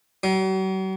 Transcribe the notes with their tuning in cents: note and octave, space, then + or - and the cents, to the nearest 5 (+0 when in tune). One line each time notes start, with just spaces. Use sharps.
F#3 +45